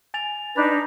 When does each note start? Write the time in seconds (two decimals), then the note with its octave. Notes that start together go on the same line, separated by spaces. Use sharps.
0.14 G#5 A6 F7
0.56 D4 D#4 B4 G6 A6